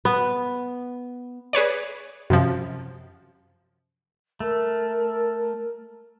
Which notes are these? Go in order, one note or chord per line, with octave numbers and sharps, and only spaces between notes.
B3
G#4 B4 C#5 D5
F#2 C3 F3
A3 A#4